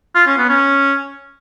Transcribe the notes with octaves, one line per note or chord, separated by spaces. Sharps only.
F4
C#4
B3
C#4